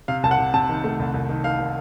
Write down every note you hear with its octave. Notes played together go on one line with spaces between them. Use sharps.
C3 F5
C2 A5
F#5
C3
C3 A5
D#3
A3
C2
C2
D#3
D#3 F5
D#3